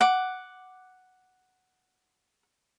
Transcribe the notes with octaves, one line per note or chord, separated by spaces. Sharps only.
F#5 D6